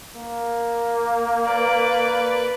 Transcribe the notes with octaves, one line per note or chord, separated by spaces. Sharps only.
A#3
B4 D5